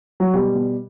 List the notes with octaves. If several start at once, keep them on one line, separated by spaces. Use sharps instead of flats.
F#3
B2 G3
B2